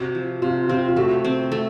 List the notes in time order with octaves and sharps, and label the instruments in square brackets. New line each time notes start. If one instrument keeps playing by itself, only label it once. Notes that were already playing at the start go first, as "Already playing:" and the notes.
Already playing: [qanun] C3 [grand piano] F#4
[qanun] F3
[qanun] C3 [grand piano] F4
[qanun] C4 [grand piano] F4
[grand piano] F4
[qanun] A3 [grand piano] F#4
[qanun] C4
A3